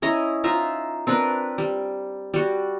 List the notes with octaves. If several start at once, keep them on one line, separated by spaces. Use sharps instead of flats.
C#4 E4 D#5 A#5
D#4 F4 E5 A#5
C4 D4 A#4 B4
G3
G3 F#4